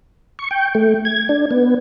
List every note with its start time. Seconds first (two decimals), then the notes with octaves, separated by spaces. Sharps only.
0.39 C#6
0.51 G5
0.75 A3
1.05 G#6
1.29 D4
1.51 B3